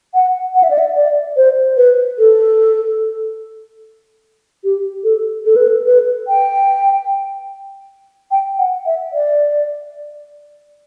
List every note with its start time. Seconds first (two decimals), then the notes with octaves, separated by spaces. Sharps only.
0.14 F#5
0.55 F#5
0.63 E5
0.70 D5
0.78 E5
0.96 D5
1.37 C5
1.77 B4
2.19 A4
4.64 G4
5.04 A4
5.45 A4
5.56 B4
5.68 A4
5.86 B4
6.28 G5
8.31 G5
8.58 F#5
8.86 E5
9.13 D5